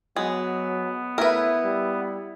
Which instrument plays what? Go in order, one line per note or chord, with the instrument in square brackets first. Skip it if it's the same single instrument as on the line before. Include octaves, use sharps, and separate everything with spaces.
[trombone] F#3 [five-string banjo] G#3 [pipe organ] B3
[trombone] A2 [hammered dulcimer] E4 [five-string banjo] A#4 B4
[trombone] G3